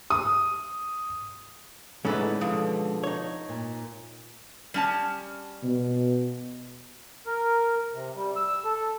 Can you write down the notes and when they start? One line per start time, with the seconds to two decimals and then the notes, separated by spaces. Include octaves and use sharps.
0.10 D#6
2.05 A2 D3 E3 G#3 C#4 D#4 A4 B4
2.41 B2 D3 F3
3.04 D#4 C#5
3.49 A#2
4.74 G3 C#4 A5
5.63 B2
7.26 A#4
7.93 C3
8.16 G3
8.36 E6
8.65 A4